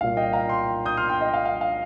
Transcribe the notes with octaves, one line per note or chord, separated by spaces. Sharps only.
C2 A#2 A#3 F5
D#5 G5
F5 A#5
G5 C6
D#6 G6
C6 F6
G5 C6
D#5
F5
F5
F5